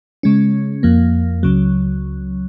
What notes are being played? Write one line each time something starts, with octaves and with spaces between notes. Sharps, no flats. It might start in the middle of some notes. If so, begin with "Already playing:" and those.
C#3 G#3 C#4
F2 F3 A#3
C#2 C#3 F#3